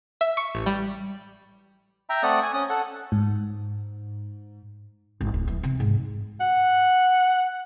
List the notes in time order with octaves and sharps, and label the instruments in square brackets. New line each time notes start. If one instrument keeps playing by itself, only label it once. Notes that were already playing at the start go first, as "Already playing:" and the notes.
[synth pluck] E5
C#6
A1
G3
[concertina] E5 G5 A#5
A3 C4 A4 D5 F#5 D#6
G#5
C#4 D#6
A4 F#5
[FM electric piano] G#2
[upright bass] G#1
D1
E3
C3
G#2
[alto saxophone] F#5